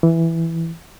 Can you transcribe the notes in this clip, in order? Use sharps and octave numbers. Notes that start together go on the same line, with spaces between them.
E3